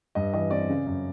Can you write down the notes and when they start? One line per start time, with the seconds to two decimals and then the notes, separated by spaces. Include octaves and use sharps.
0.15 G2 D#5
0.33 E3 D#5
0.50 C4 D5
0.69 C#3
0.86 F#2